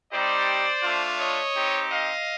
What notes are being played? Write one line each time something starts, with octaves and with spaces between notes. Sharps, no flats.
G3 C4 D#4 G4 C5 D5
A3 D4 F4
C#5 D#5
C4 D#4 G4
D#5 F5